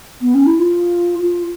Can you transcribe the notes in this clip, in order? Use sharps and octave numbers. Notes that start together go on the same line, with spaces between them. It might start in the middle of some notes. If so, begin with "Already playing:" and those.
B3
C#4
E4
F4
F4